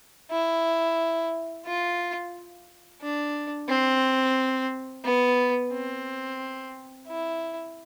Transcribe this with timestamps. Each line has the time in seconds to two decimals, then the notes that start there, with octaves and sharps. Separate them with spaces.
0.31 E4
1.66 F4
3.01 D4
3.70 C4
5.04 B3
5.72 C4
7.08 E4